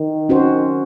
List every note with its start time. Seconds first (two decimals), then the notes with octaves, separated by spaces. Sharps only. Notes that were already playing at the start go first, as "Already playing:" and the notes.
Already playing: D#3
0.29 C#4 F#4 C5